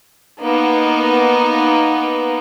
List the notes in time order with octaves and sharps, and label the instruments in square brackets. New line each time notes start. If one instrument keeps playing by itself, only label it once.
[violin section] A#3 B3 D#4